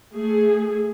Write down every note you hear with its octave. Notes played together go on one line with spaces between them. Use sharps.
A3 G#4